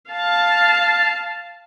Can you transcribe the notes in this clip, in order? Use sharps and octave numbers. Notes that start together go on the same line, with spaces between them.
F5 A5